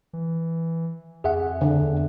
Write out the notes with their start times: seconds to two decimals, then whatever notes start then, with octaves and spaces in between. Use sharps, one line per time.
0.13 E3
1.24 F2 G#4 E5 F#5
1.61 D3
1.82 E2